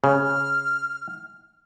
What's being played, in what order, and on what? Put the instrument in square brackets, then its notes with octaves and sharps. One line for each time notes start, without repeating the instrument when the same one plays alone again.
[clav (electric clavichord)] C#3 [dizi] F6